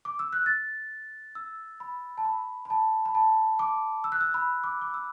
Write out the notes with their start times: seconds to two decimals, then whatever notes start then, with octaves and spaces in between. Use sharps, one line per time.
0.05 D6
0.19 E6
0.33 F#6
0.46 A6
1.35 E6
1.80 B5
2.18 A5
2.25 B5
2.65 B5
2.70 A5
3.05 B5
3.15 A5
3.59 D6
4.04 E6
4.12 F#6
4.21 E6
4.34 B5
4.64 D6
4.81 D6
4.94 E6